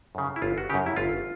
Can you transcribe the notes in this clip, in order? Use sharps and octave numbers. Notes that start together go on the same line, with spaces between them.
F#2 C#3
E4
G1 F4
F#4
F#2 C#3 G4
E4
G1 F4